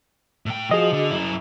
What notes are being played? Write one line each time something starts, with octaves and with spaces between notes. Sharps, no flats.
A2 G5
F3 F#4 G#4 D#5
D3
F#2 E4